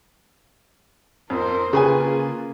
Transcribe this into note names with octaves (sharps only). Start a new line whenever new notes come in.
F2 A#4 C5
C#3 A#3 F4 G#4 B4 G#5